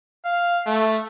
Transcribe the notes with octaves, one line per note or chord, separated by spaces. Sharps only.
F5
A3